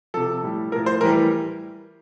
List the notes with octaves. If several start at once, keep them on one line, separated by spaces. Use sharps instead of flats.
C3 F3 A4
A2 G3
A2 F3 A#4
C5
A2 E3 G3 A#4